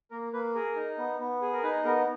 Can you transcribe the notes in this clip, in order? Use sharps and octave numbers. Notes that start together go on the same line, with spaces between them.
A#3 A#4
A#3 B4
G#4 A#4
D#4
B3
B3
G#4
A#4
D#4 B4
B3 A#4